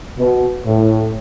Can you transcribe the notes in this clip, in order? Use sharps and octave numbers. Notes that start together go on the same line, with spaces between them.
B2
A2